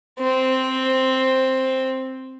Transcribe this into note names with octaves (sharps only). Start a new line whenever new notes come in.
C4